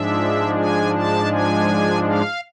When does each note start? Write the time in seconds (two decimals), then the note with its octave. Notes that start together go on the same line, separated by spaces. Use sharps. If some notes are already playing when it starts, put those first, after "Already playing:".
Already playing: G#2 F3 G#3 D4 E5
0.57 G#5
0.95 A5
1.32 G#5
2.07 F5